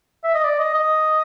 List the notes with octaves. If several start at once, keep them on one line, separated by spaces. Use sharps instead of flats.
E5
D#5
D5
D#5
D#5